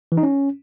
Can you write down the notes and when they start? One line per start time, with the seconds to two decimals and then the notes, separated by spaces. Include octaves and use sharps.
0.12 E3
0.17 D#4
0.23 C#4